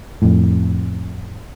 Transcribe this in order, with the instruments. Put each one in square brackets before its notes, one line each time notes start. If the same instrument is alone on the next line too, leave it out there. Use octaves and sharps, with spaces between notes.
[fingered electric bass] F2 A2